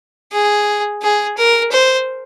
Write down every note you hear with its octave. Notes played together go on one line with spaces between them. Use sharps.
G#4
G#4
A#4
C5